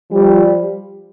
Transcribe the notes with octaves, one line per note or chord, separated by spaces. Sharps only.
F3 G3